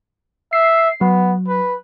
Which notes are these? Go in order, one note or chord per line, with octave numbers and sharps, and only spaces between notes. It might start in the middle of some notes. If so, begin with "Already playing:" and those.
E5 C7
F#3 B3
B4